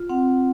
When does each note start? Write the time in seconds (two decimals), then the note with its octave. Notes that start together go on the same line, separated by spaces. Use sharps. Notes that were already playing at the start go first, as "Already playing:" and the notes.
Already playing: F4
0.09 C4 F#5